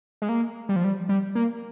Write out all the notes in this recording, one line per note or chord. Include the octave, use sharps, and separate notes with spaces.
G#3
A#3
G3
F3
G3
G3
A#3